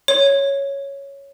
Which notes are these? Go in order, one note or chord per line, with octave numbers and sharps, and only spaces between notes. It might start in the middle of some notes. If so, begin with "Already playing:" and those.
C#5